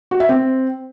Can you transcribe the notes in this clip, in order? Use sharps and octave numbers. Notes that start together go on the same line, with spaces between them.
F#4
E5
C4